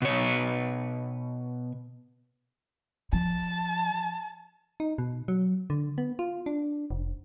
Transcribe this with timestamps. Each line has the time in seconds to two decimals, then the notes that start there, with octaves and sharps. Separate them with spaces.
0.02 B2 C#5
3.13 F3 A5
4.80 D#4
4.98 B2
5.28 F#3
5.70 D3
5.98 B3
6.19 F4
6.46 D4
6.91 F1